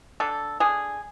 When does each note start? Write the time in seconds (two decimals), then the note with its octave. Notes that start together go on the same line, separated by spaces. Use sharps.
0.20 D3 A4
0.60 D3 G#4